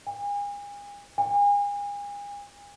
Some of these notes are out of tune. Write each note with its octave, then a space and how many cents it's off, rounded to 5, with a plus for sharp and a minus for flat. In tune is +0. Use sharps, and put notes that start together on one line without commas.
G#5 -35
G#5 -35